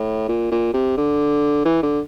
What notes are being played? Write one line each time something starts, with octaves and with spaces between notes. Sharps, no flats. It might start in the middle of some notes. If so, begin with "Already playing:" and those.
Already playing: A2
A#2
A#2
C3
D3
E3
D3